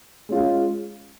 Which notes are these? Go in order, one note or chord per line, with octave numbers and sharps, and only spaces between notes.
G#3 C#4 F4